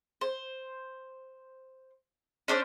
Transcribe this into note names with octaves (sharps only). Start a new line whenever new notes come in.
C5
C#4 D4 C5 D5